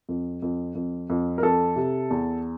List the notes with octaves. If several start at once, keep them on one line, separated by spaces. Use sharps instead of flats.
F2
F2
F2
F2
A#4
F2 A4
C3
E2